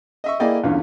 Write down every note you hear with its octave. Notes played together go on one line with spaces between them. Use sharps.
D#5 E5 C#6
A#3 E4 G#4 D5 D#5 G5
E2 G2 D3 C#4 F4